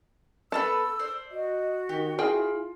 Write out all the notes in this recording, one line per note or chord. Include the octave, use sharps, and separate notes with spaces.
B3 A4 B4 A5 E6
C5 D5
F#4 D#5
D#3 G4
E4 F4 G#4 G5